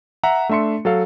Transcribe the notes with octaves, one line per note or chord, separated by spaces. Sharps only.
E5 F#5 A#5
A3 D4 E5 C6 C#7
F#3 A4 F5